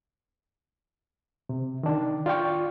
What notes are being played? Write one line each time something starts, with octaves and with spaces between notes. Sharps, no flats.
C3
D#3 D4
F4 D5 F5 G5 C#6